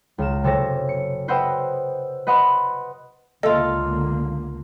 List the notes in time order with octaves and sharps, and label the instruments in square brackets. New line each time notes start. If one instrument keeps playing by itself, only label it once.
[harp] C#2 A#4 E7
F#1 C3 A4 C#5 A#6
C#7
B4 C5 D#5 F#5 G5 E6
B4 D#5 F#5 B5 C6
[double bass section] C#2 D3 A#3 [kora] F4 A4 [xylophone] D#5